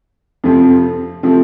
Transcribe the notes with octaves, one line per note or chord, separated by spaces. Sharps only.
F2 C3 F3 A3 C4
C3 F3 A3 C4